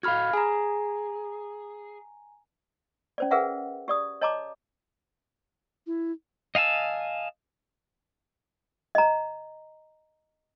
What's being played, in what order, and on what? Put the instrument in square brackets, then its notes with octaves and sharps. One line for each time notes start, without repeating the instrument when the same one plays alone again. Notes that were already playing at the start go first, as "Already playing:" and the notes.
[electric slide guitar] F#4 A4 F5 [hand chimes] B5 F6 G#6
[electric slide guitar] G#4 [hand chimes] G#5 A#5
[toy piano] C#4 C5 D5
G#4 A#4 B4 E5 F#5 G5
G4 D5 D#6
C#5 D#5 A5 A#5 D6
[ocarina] E4
[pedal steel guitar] D#5 F5 G#5 A5 E6
[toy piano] D#5 A#5